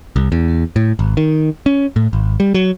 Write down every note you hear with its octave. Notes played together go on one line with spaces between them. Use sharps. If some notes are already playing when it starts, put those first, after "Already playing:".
C2
E2
A2
G#1
D#3
C#4
A2
G#1
G3
F#3